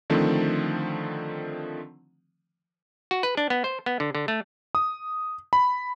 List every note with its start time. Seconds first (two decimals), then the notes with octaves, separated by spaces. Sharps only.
0.10 D3 D#3 F3 A3 C4
3.11 F#4
3.23 B4
3.37 D4
3.50 B3
3.64 C5
3.86 B3
4.00 D3
4.15 D3
4.28 A3
4.75 D#6
5.53 B5